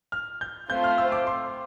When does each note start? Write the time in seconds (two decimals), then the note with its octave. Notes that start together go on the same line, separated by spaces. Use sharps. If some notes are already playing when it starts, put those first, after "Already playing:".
0.12 F6
0.41 G6
0.70 A3 C4 F4 C5 G6
0.84 F6
0.98 E6
1.12 D6
1.27 C6